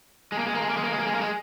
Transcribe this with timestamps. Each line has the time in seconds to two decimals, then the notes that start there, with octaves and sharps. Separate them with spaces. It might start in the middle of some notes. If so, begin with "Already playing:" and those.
0.32 G#3
0.39 A#3
0.47 G#3
0.55 A#3
0.62 G#3
0.69 A#3
0.77 G#3
0.84 A#3
0.92 G#3
0.99 A#3
1.07 G#3
1.15 A#3
1.21 G#3